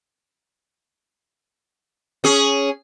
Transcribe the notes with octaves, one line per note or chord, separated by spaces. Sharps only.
C#4 G#4